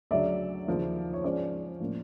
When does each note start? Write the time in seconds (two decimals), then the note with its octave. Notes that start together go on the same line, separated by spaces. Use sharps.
0.11 D2 C#3 F#3 D5 E5
0.67 D#2 C#3 F3 A#3
1.14 C#5
1.24 G#2 F3 G#3 C#4 C5 D5
1.79 A2 F3 A#3 C#4